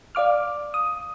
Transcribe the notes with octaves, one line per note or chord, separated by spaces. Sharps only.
D5 F5 D6 F6
D#6